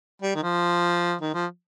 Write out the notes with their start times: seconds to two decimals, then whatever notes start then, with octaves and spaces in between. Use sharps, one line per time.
0.22 G3
0.35 D#3
0.42 F3
1.21 D#3
1.34 F3